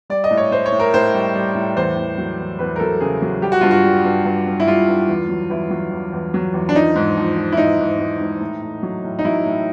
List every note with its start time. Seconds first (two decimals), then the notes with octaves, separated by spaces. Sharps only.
0.10 G3 D5
0.24 D#5
0.31 A2
0.37 C#5
0.51 A2 C5
0.66 C#5
0.72 A2
0.80 A#4
0.94 A2 C5
1.14 G3
1.35 G3
1.55 A2
1.76 E2 C5
1.97 E2
2.18 F#3
2.38 E2
2.59 E2 B4
2.76 A#4
2.80 F#3 A4
3.01 C#3 G#4
3.22 F#3
3.42 G3 G4
3.52 F#4
3.61 G2 F4
3.71 F#4
3.84 G3
4.05 G2
4.25 G2
4.47 G2
4.60 E4
4.67 G3 F4
4.88 G2
5.09 E2
5.29 F#3
5.50 E2 E4
5.70 F#3
5.92 E2
6.12 E2
6.34 F#3
6.54 E2
6.69 D4
6.75 F3 D#4
6.96 G#2
7.17 F3
7.37 F3
7.52 E4
7.57 G#2 D#4
7.79 G#2
7.99 G#2
8.21 G#2
8.41 A2
8.62 A2
8.83 F#3
9.04 A2
9.19 D#4
9.25 F#3 E4
9.46 A2